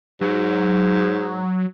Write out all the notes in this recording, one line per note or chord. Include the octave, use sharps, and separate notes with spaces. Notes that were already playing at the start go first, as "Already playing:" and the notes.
G#2 F#3